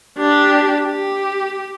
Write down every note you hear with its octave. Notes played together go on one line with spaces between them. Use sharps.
D4 G4
G4